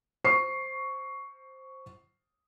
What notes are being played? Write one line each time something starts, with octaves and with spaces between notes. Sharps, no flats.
C5 C#6 C7